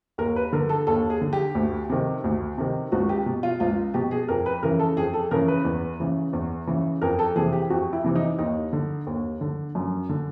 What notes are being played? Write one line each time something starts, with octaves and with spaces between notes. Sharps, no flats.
D#2 A#4
B4
D3 A#4
A4
D#2 A4
G#4
D3
G4
D2
C3 D#3
D2
C3 D#3
C#2 F#4
G4
B2
F4
C#2 F4
B2 G4
G#4
F2 A#4
B4
C#3 E3 A#4
A4
F2 G#4
A4
C#3 E3 A#4
B4
E2
C#3 E3
E2
C#3 E3
F2 A#4
A4
C3 E3 G#4
G4
F2 F#4
E4
C3 E3
D#4
D#2 D#4
D3
D#2
D3
F#2
D3